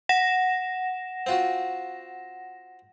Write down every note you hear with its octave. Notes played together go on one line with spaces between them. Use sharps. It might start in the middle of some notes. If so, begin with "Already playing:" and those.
F#5 A#6 E7
C4 F4 F#4